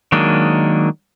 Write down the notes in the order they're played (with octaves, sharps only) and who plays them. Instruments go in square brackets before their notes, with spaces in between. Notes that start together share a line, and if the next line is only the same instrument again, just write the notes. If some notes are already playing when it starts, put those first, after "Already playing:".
[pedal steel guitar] D#3 F#3 G#3 A#3 D4